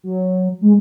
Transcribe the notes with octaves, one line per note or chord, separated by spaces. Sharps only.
F#3
G#3